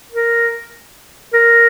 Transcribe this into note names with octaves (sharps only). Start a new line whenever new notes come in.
A#4
A#4